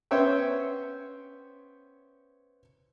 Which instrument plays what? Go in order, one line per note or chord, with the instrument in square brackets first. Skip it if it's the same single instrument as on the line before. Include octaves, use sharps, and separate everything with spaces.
[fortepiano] B3 C#4 C5 C#5 E5 G5